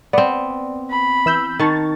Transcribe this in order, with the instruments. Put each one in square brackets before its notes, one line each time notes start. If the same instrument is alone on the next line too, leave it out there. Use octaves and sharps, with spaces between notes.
[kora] B3 C4 [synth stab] D5
[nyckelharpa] B5
[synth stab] E3 E6 G6
[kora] D#3 [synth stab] A5 C#6 A6